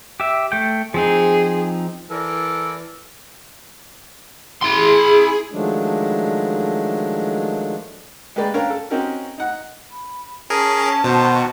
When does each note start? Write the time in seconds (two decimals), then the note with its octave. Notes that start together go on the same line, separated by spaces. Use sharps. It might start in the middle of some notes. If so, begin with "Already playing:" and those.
0.20 G4 E5
0.52 A3 G5
0.94 F3 C4 D#4 G#4
2.11 E3 A4 A#4 D5
4.63 E4 G#4 C6
5.52 D#3 F3 F#3 G#3 A3 D4
8.36 G#3 A#3 G4 B4 D5
8.54 C#4 D4 A#4 C#5 F5 G5
8.70 A4
8.90 C4 C#4 D#4 F#4 G4 A#4
9.38 D#4 F#5
9.90 B5
10.50 C#4 G#4 A#4 A5
11.04 B2 D#3 B3 F#4 C5